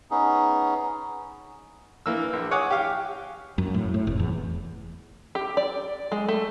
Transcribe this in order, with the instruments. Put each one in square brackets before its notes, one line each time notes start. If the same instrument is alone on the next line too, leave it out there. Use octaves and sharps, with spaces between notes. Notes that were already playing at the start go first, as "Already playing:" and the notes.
[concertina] B3 C#4 D#4 G#4
[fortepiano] E3 A#3 E6
A#1
C#5 F#5 G#5 D6 D#6
G4 F5
[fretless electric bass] F#2
A2
A2
F1
E2
[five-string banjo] G4
D5
G#3
A3